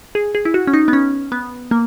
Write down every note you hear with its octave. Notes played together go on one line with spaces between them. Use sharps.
G#4
G#4
E4
F#4
C#4
D#4
B3
C#4
B3
A#3